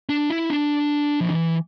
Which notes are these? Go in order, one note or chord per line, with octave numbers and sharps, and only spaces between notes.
D4
E4
D4
F3
E3